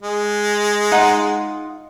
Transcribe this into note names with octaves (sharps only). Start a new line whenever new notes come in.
G#3
D#4 F4 F#5